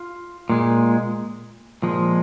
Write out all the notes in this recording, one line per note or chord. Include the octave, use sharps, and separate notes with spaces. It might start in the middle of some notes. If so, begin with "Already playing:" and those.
Already playing: F4
A#2 G#3
A#2 F3 G#3